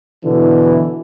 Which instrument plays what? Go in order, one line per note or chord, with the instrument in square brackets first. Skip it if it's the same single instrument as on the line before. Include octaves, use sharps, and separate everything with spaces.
[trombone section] B2 D3 E3